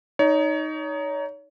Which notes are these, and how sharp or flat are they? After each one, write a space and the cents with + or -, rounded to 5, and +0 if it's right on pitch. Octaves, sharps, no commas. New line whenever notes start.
D#4 +0 C#5 +30